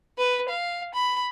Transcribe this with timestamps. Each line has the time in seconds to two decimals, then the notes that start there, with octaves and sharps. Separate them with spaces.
0.18 B4
0.49 F5
0.94 B5